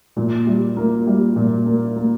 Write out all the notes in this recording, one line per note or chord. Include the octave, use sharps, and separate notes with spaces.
A#2
G3
A#3
G3
A#2
A#3
A#3